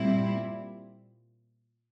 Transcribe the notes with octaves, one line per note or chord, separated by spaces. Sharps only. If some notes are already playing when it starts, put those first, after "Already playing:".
Already playing: A#2 G3 C4 E4